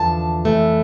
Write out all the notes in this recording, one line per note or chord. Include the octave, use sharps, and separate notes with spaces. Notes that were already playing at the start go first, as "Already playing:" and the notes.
Already playing: E2 D3 F3 A5
F2 E3 A3